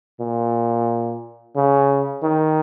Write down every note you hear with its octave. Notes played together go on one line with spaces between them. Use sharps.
A#2
C#3
D#3